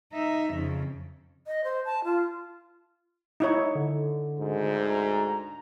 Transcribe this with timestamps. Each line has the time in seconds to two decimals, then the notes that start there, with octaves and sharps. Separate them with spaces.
0.13 D#4 E5
0.53 F2 C#3
1.47 D#5
1.64 C5
1.85 A5
2.04 F4
3.40 D#4 E4 C#5
3.75 D3
4.40 D2 G#2
4.90 A#5